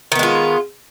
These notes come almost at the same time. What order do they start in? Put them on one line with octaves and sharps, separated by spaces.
D#3 B3 G#3 F4